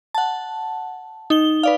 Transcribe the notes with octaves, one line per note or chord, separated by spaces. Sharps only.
F#5 A5
D#4 G7
B4 D5 F5